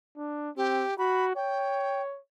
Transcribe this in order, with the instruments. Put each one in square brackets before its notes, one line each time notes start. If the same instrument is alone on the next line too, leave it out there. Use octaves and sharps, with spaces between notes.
[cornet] D4
[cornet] C4 [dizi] G4
[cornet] F#4 [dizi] B5
[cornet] C#5 [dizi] G5